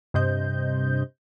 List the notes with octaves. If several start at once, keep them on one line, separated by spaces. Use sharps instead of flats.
G2 C3 C5 D#5 G6